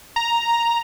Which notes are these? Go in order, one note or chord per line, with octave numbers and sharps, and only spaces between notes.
A#5